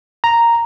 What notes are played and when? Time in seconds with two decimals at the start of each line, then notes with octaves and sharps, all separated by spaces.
0.24 A#5